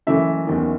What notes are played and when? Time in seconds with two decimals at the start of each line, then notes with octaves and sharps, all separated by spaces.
0.07 F#1 F#2 E3 A3 E5
0.47 F#1 E2 D#3